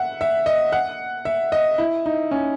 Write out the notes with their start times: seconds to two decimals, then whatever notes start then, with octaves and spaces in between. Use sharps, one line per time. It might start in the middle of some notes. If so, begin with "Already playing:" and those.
Already playing: E5 F#5
0.21 E5
0.46 D#5
0.72 F#5
1.25 E5
1.52 D#5
1.78 E4
2.06 D#4
2.31 C#4